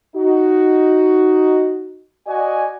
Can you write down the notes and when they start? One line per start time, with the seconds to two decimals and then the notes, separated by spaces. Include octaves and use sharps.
0.15 D#4 F#4
2.27 F#4 D5 D#5 G#5